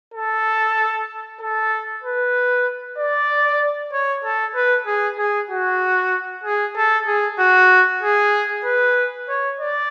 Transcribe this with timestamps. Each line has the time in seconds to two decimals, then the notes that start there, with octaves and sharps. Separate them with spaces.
0.14 A4
1.40 A4
2.03 B4
2.98 D5
3.93 C#5
4.24 A4
4.55 B4
4.86 G#4
5.18 G#4
5.51 F#4
6.44 G#4
6.76 A4
7.07 G#4
7.39 F#4
8.03 G#4
8.65 B4
9.29 C#5
9.60 D5